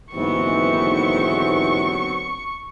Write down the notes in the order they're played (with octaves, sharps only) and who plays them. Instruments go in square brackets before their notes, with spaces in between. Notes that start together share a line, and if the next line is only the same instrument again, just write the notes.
[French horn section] D#2 D3 F#3 [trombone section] G#2 E3 [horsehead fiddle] B3 C4 [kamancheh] C#6